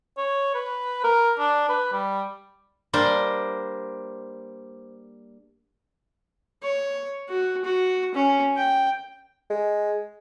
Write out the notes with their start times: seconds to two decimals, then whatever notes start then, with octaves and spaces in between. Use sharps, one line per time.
0.18 C#5
0.54 B4
1.04 A#4
1.39 D4
1.69 B4
1.93 G3
2.93 G3 A#3 D4 C5
6.63 C#5
7.29 F#4
7.64 F#4
8.15 C#4
8.57 G5
9.50 G#3